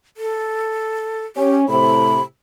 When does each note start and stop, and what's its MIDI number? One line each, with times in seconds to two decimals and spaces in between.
0.17 1.26 69
1.36 1.65 61
1.36 1.56 67
1.69 2.19 45
1.69 2.19 48
1.69 2.22 83